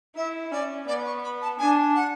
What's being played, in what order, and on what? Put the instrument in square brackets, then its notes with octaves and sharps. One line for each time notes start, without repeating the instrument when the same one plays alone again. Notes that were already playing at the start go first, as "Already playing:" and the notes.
[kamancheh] E4 [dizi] E5
[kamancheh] C#4 [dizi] D5
[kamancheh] B3 [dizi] D5
[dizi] C#6
B5
A5
[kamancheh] D4 [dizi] G#5
[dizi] F#5